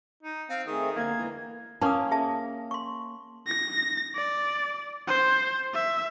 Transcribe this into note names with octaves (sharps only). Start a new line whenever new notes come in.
D#4
C4 F5
D#3 A3 C4 G#4 D#6
D3 A#3 G#6
E2 E3 G#3
A#3 C#4 A5 D#6
G#4 E5 A5
C6 C#6
A#6
D5
C5
E5